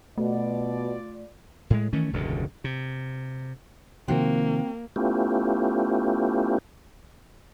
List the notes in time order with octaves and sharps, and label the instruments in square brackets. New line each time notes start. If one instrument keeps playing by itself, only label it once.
[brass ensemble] B2 [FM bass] A3 [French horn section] F4 D5
[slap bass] A2 G#3
D#3 E3 A3 C#4
E1 C#2 G2 D3
C3
[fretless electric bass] C3 D#3 F3 [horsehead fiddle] A#3 [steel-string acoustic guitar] C4 F#4 G5
[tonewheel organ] A3 B3 C#4 E4 F4 G4